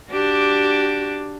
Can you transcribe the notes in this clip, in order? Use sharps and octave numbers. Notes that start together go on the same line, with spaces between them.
D4 F#4 G4